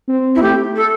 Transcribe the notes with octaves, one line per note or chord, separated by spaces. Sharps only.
C4
E4
A3 G4
A4